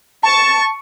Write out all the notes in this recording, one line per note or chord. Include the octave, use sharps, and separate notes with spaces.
A5 C#6